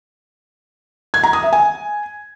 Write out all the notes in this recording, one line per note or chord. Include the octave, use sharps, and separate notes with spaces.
G#6
A#5
D#6
E5
G#5